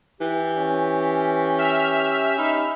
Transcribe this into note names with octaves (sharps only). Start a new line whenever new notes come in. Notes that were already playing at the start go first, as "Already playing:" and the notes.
E3 G4
C#4
E5 F6
D#4 B5